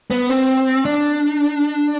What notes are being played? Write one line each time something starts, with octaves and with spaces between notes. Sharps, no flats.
B3
C4
D4